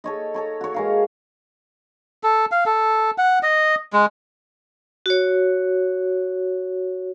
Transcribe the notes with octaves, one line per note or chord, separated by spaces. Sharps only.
A4 C#5 D#5
A4 C#5 A#5
F#4 C#5
G#3 A#4 F5
A4
F5
A4
F#5
D#5
G#3
F#4 C#5